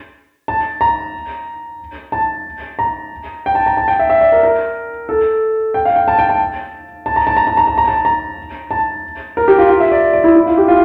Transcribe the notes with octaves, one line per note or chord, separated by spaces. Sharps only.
A5
A#5
A5
A#5
G5
A5
A#5
A5
G5
E5
E5
D5
A#4
A#4
A4
G5
F5
G5
A5
G5
A5
A5
A#5
A5
A#5
A5
A#5
A5
A#5
A5
A#5
A5
A#4
G4
F4
F4
E5
D5
D5
E4
E4
F4
G4
F4